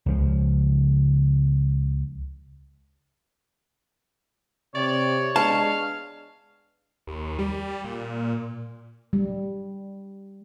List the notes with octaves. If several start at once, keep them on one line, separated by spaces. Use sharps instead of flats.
C#2 C#3 F3
C3 C#5 D5
G#3 B3 D4 F5 A5
D#2
G3
A#2
G3